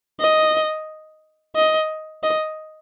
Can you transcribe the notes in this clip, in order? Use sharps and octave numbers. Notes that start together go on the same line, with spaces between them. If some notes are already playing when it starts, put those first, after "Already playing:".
D#5
D#5
D#5